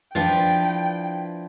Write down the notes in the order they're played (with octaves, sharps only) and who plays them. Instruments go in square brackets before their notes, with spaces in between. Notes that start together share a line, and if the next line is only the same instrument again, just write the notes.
[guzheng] F3 [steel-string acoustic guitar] D4 E4 B4 [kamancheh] G5